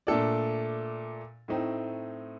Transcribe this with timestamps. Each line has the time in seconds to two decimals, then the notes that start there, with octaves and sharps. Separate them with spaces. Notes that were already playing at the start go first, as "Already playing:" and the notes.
0.07 A#2 A3 D4 A4 D5
1.48 A2 A3 C4 D#4